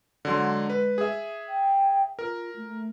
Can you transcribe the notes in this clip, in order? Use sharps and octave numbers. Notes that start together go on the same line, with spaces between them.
D3 F#3 G#3 C6
B4
G#4 E5
G5
F4 A#4
A3